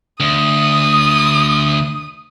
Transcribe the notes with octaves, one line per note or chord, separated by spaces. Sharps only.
D2 D#6